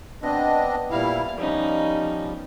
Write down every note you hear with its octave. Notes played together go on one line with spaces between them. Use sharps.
B2 C4 D4 D#5
A#2 G3 E4 F5
F3 G3 C#4 D#4 G4